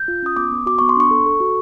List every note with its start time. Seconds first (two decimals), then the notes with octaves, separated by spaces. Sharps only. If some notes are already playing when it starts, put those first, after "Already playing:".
Already playing: G6
0.08 F4
0.22 C#4 D#6
0.36 B3 D6
0.51 B3
0.66 F#4 D6
0.79 B3 C#6
0.89 C6
0.96 D4 C#6
1.11 A4
1.26 A4
1.40 F#4